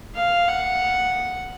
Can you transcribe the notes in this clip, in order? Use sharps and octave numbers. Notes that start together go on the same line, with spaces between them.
F5
F#5